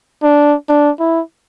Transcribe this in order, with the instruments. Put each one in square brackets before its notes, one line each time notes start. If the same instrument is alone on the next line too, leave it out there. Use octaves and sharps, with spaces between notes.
[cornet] D4
D4
E4